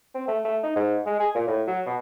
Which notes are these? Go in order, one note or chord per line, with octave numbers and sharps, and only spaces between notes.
C4
A3
A3
D#4
G#2
G#3
G#4
A#2
A2
F#3
B2